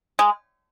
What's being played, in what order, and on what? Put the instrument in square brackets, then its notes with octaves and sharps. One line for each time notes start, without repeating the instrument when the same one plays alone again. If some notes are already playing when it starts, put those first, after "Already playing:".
[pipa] G#3